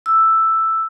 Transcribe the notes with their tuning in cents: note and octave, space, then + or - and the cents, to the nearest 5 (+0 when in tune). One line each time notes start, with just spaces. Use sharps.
E6 +5